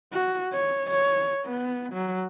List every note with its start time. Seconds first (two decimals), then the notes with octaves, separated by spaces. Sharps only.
0.12 F#4
0.53 C#5
0.90 C#5
1.45 B3
1.93 F#3